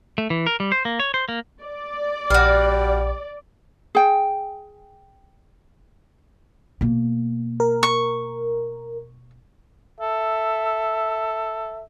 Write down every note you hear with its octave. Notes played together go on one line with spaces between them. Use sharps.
A3
E3
A#4
G3
C5
A#3
C#5
C5
A#3
D5
A#1 G3 F#4 F5
G#4 G5
B2 A#3
A#4
C#6
A4 E5